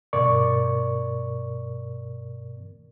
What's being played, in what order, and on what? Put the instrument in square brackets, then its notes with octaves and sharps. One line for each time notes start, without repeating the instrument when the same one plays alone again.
[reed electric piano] G2 B2 A#4 D5 C#6